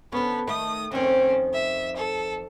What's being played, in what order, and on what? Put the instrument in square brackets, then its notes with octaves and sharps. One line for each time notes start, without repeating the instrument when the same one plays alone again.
[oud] D3 C#4 [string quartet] B3
[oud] D#3 A3 [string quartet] D#6
[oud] F2 D#3 [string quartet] C4 C#4
[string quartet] E5
A4